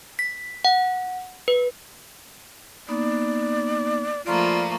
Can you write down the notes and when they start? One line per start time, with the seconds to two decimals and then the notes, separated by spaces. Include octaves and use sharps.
0.19 B6
0.65 F#5
1.48 B4
2.88 A#3 B3 D#4 D5
4.26 F3 A3 A#3 F4 D5 A#5 B5